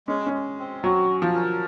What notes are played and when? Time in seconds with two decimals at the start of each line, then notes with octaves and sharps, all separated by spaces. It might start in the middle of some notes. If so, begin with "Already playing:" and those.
0.07 G#3 C#4
0.26 C#4
0.33 G#3
0.59 C4
0.84 F#3 F#4
1.10 C#4
1.22 F3
1.35 A#4